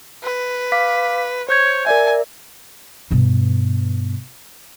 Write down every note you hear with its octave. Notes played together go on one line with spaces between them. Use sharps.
B4
F5 D6 B6
C5 C#5 G6 G#6
A#4 D5 E5 G#5
G2 B2